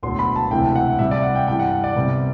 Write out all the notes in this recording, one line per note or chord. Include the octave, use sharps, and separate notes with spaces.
E1 D2 D3 F#3 B3 C6
B5
A5
E1 D2 C3 E3 A3 G5
F#5
C2 C3 G3 E5
D5
F#5
G5
G2 E3 G3 G5
F#5
D5
C2 C3 G3 B3